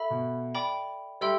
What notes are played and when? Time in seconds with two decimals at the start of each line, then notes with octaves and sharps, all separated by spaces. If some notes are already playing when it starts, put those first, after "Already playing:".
Already playing: A4 E5 B5
0.10 B2
0.55 D5 G5 B5 D6
1.21 G3 A4 E5 G5 C6 E6